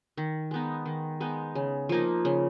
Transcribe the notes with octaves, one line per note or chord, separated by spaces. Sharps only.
D#3
G#3 B3 D#4
D#3
G#3 B3 D#4
C#3
F3 A#3 D#4
C#3